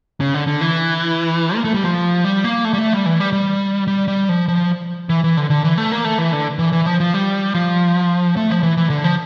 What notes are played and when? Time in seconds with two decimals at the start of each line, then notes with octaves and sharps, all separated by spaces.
0.20 C#3
0.34 D3
0.47 D3
0.61 E3
1.56 A#3
1.65 A3
1.74 G3
1.83 F3
2.24 G3
2.44 A#3
2.65 A3
2.74 G3
2.78 A3
2.93 G3
3.06 E3
3.20 G3
3.33 G3
3.87 G3
4.08 G3
4.29 F3
4.48 F3
5.09 E3
5.24 E3
5.37 D3
5.50 D3
5.64 E3
5.78 A3
5.92 A#3
6.04 A3
6.18 E3
6.33 D3
6.59 E3
6.72 E3
6.86 F3
7.00 F3
7.14 G3
7.55 F3
8.37 A3
8.50 F3
8.63 E3
8.77 E3
8.90 D3
9.04 F3